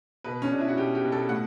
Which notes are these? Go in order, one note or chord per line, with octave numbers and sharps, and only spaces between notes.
B2 B4
C#4
B2 D4
E4
F#4
B2 G4
G4
B2
A4
A2 F#5